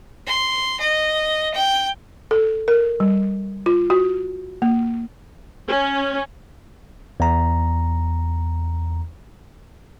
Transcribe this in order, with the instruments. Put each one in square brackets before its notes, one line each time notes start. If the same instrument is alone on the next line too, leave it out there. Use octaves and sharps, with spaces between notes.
[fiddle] C6
D#5
G5
[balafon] A4
A#4
G3
F4
F#4
A#3
[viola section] C#4
[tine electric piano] E2 A#5